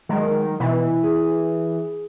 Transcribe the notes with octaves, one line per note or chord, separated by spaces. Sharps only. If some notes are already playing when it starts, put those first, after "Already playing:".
D#3 F#3 G#3 A#4
B2 E3
G#4